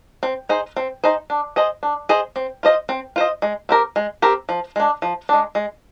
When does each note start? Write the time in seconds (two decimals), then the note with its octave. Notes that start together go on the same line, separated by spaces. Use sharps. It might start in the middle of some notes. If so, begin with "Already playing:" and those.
0.23 C4
0.49 D#4 G#4 C5
0.76 C4
1.04 D#4 G#4 C5
1.30 D4
1.56 G#4 C5 D#5
1.83 D4
2.09 G#4 C5 D#5
2.36 C4
2.63 F4 C5 D#5
2.89 C4
3.16 F4 C5 D#5
3.42 G#3
3.69 C4 G4 A#4
3.96 G#3
4.22 C4 G4 A#4
4.49 F3
4.76 G#3 D4
5.02 F3
5.29 G#3 D4
5.55 G#3